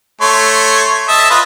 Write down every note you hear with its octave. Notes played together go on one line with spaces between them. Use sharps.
A3 C#5 C6
D#5 E5 A5
F4 B4 D#5